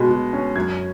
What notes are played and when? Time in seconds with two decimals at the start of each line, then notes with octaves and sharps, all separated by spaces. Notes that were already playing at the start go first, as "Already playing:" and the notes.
Already playing: B2 G#3
0.10 B2
0.33 C#4
0.56 F#2 G#6